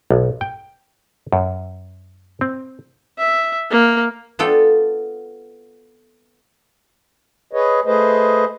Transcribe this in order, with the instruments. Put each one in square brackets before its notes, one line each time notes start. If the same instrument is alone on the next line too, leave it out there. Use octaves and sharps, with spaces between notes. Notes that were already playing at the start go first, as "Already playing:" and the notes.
[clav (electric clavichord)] B1
G5
F#2
C4
[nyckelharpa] E5
A#3
[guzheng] B3 F4 A4 D5 G5
[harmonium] G#4 B4 C#5 D#5
A3 G#4 B4 C5 D#5